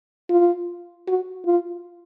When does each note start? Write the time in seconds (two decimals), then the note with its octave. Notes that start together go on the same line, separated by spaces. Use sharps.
0.30 F4
1.08 F#4
1.46 F4